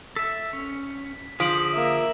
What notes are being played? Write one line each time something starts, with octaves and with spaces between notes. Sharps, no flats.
A4 E5 B6
C#4
D3 F3 G#4 B6 D7 F#7
A#3 E5